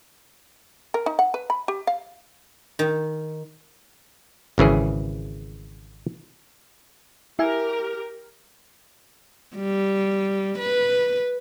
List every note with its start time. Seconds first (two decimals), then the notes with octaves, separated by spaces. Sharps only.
0.94 A#4
1.06 D#4
1.19 F#5
1.34 B4
1.50 B5
1.68 G4
1.87 F5
2.79 D#3
4.58 G#1 C#3 E3 G#4
7.39 E4 G4 A#4 E5 G#5
9.56 G3
10.58 B4